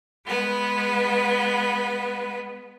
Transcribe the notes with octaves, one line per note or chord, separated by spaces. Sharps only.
G#3 B3 B4